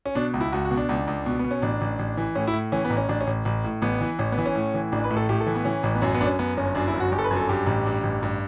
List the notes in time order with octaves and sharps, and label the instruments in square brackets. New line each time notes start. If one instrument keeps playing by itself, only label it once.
[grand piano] C#4
B2 D4
C#2
E4
C#2 F#4
F#4
B2
D4
C#2
C#2
B2
B2 B3
C#4
A1 D4
A1
A1
E3
A2 C#4
E4
A2
E3 C#4
B3
A1
C#4
A1 D4
C#4
A1
A1
A2
A1 B3
E3
A1 C#4
B3
E3
C#4
A2
E3
A1 D4
B4
A2
A4
A2 G4
A4
E3
B3
E3 C#4
A1
B3
F#2 C#4
B3
F#2 D4
C#4
F#2 B3
G1 C#4
F#2 D4
E4
G1
F#4
G1 G4
A4
B4
F#2
A4
G2 G4
A1
G2
A1
G2